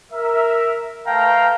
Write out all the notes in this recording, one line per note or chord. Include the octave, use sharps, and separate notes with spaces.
A#4 E5
A3 B4 F5 G5 A5 A#5